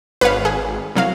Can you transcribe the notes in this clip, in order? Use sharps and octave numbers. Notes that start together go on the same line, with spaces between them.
G#1 B4 C#5 F5
G#4
C2 F#3 F5